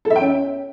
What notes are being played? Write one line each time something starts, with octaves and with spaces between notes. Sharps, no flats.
A4
E5
G5
C#4